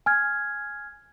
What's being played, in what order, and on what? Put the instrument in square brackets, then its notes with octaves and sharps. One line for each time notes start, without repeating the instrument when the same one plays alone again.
[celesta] G#5 F6 G#6